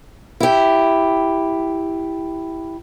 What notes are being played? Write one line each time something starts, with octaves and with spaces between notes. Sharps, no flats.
E4 G4